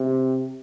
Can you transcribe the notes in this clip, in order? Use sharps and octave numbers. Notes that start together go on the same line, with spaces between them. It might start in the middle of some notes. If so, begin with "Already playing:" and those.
Already playing: C3